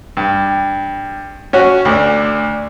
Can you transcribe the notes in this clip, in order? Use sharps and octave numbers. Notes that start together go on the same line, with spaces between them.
G2
C#4 F#4 C#5
D2 D4